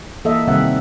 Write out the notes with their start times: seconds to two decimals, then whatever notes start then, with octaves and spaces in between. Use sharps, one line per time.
0.25 E3 A#3 A4 D#5 E5
0.47 C3 D#3 G3 C4 E5 F#5